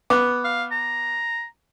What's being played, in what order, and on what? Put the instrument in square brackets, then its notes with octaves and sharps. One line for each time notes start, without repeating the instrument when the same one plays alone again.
[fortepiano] B3 [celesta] D6 F#6
[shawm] F5
A#5